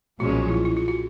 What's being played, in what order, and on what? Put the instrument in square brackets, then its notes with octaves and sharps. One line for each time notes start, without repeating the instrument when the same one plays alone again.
[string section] B1 A#2 F3 G#3 C#4 [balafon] F#4
[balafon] E4
F4
E4
F4
F#4